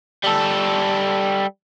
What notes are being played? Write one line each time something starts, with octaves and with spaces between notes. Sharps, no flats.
G3 A4